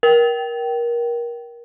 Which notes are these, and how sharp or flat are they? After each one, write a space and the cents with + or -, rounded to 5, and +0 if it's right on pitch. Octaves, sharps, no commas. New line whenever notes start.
A#4 +25 G5 -20